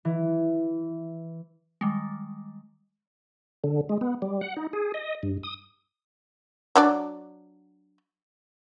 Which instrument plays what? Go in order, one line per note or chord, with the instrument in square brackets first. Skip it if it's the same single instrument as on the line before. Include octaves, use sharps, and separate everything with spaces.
[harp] E3
[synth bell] D#3 G3 G#3
[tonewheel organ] D3
G#3
B3
G3
F#5
D#4
G#4
D#5
G2
D#6
[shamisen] F#3 D4 D5